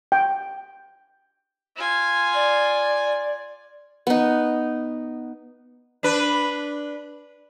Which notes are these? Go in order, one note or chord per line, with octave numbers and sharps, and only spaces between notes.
G5
F4 G#5
D5
B3 D#4
D4 B4